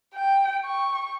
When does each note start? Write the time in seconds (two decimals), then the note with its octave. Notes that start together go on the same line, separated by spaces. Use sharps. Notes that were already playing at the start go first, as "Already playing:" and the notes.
0.15 G5
0.65 C#6